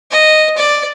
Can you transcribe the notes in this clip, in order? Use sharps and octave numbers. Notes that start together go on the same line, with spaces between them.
D#5
D5